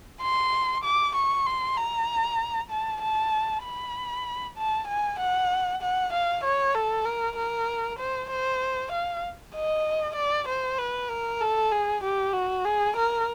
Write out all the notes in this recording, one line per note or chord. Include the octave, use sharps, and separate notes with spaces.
C6
D6
C#6
C6
A#5
A5
A5
B5
A5
G#5
F#5
F#5
F5
C#5
A4
A#4
A#4
C5
C5
F5
D#5
D5
C5
B4
A#4
A4
G#4
G4
F#4
G#4
A#4